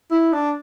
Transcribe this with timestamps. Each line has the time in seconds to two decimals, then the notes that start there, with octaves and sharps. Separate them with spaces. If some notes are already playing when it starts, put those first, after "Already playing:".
0.11 E4
0.33 D4